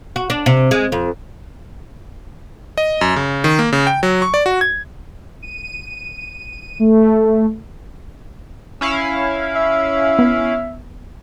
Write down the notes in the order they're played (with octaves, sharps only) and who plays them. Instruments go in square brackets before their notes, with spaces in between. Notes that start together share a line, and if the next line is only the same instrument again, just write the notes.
[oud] F#4
D4
C3
G#3
F2
[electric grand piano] D#5
F#2
C#3
D#3
A#3
C#3
G5
F#3
C#6
D5
F#4
G#6
[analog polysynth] D#7
A3
C#4 E4 F5
[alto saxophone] E5
[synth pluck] B3